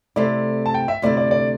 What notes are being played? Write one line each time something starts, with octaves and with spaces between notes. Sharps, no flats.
C3 A3 C4 E4 D5
A5
G5
E5
D2 C3 A3 E4 D5
D5
D5